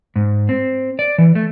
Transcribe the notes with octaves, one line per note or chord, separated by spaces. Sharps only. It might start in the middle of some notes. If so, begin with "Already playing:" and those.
G#2
C4
D5
E3
A3